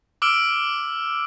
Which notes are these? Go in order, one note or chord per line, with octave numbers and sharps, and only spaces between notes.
D6 E6 F6 D7